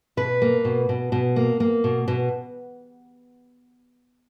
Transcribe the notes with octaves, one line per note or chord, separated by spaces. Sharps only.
B2 B4
A#3
B2
B2
B2
A#3
A#3
B2
B2